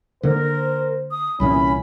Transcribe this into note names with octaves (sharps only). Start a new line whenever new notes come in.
D3 A#3 A#4 C5
D#6
C2 A#2 E3 C#4 B5